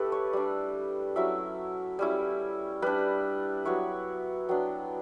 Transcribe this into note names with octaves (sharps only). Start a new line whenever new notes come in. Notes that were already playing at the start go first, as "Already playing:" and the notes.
Already playing: A3 E4 G4 A4 B4
C#5
G3 D4 D5
F#3 C#4 E4 E5
G3 C#4 E4
G3 D4 B4
F#3 B3 E4 C#5
F#3 B3 D4 G5